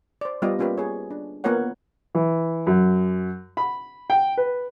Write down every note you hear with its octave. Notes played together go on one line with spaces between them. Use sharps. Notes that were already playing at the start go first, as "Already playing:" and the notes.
C5 D5
G3 B3 F4 G4 D5 D#5
A#3 C#4 F4 G4 B4
G#4 C#5
D4
A#3 B3 F4 A#4 C#5 F#5
E3
F#2
B5
G5
B4